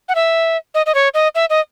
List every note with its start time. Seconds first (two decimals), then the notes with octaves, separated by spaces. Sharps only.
0.09 F#5
0.15 E5
0.75 D#5
0.86 D#5
0.95 C#5
1.14 D#5
1.35 E5
1.50 D#5